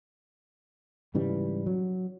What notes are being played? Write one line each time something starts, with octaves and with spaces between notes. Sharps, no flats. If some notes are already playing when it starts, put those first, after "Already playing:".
G#2 C#3 E3 G3
F#3